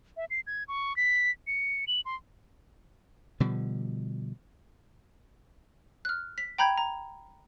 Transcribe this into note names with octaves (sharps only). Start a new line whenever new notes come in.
E5
C7
G#6
C#6
B6
C#7
F#7
C6
B2 D3 F3 G3
F6 F#6
B6
G5 A#5 B5 G6 G#6
A#5